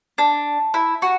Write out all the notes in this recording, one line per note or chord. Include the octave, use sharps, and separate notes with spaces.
D4
E4
F#4